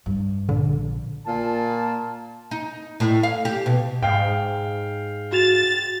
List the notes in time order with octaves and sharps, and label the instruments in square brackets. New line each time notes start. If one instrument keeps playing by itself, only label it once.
[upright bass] G2
[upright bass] A#1 [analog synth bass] D3
[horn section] A#2 A5
[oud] D#4
A2
F5
G4
B2
[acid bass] G#2 [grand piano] F5 G5
[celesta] F#4 E7 F7 [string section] A6